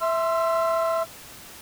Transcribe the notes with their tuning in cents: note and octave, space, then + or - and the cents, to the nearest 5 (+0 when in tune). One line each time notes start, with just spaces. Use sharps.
E5 +0 C6 +0 E6 +45